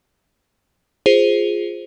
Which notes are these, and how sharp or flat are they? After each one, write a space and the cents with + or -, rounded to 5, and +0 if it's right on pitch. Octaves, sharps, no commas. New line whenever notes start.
F4 +0 G#4 -5 C5 +0